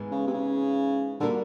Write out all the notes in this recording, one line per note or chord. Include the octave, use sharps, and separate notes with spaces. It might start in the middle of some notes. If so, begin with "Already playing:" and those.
Already playing: G#2 E3 G#3 B3
C#3
C3
C#3
D3 G3 A#3 D4 F#4 A#4